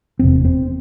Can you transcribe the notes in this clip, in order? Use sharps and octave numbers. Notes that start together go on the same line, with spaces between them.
F1 E2 C3 C4
C4